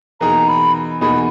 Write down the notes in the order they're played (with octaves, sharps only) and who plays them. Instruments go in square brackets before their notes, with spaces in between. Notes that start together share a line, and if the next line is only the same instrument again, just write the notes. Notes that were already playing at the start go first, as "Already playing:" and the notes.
[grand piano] E2 B2 A#3 D#4 G#4 [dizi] A#5
[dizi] B5
[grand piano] E2 B2 A#3 D#4 G#4 [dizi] B5